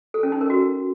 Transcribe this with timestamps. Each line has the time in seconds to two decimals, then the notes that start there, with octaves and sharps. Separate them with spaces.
0.14 A4
0.23 C#4
0.32 D#4
0.41 A#4
0.50 F#4